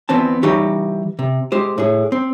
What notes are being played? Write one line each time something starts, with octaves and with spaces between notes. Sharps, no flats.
E3 B3 C4 A5
E3 G3 D#4 G4 C#5
C3
G#3 G4 C5
A2 G#4
C4